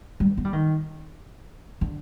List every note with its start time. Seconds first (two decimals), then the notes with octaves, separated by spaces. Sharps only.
0.20 G3
0.37 B3
0.45 G3
0.53 D#3
1.81 D3